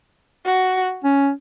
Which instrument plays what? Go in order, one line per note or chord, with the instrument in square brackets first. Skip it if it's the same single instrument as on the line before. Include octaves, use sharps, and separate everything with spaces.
[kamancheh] F#4
[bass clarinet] C#4